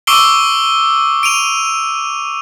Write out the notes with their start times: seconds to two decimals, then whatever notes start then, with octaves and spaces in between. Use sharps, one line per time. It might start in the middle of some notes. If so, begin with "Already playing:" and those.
0.07 C#6 D6 E6 C7 D7 G7
1.23 D7 D#7 F7